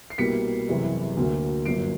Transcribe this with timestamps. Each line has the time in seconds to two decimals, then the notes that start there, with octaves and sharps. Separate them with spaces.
0.10 C7
0.18 C2 B2 G3 A#3 B6 C#7
0.68 F#1 E2 C3 E3 G3
1.17 D2 D3 F#3 A#3
1.65 G1 F#2 D3 F#3 A#3 C7 D7